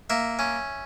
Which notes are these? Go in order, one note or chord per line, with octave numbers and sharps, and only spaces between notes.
A#3 E5
C#4